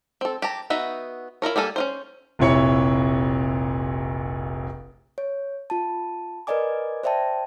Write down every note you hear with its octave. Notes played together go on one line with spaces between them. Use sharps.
C4 A4
G4 A5 A#5
B3 D#4 F#4 E5
E4 F4 A#4 C#5
G3 A#3 A4 G#5
C#4 F4 C5
F1 A#1 C3 E4 C#5 C#7
C#5
F4 A5
A#4 B4 D5 D#5 G#5 D6
C5 D5 E5 G5 A5